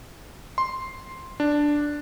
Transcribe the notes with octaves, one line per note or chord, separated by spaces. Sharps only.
C6
D4